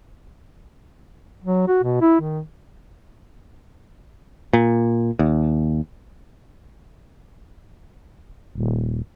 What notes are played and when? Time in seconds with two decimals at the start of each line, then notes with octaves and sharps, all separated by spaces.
1.44 F#3
1.68 F#4
1.83 B2
2.01 E4
2.20 D#3
4.53 A#2
5.19 D#2
8.55 D#1